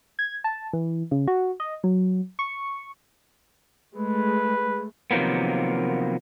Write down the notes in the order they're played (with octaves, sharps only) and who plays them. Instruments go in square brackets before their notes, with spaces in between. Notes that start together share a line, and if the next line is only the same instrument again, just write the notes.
[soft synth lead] G#6
A5
E3
C#3
F#4
D#5
F#3
C#6
[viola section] G#3 A3 [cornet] B4
[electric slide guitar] C3 D#3 F3 F#3 A#3 B3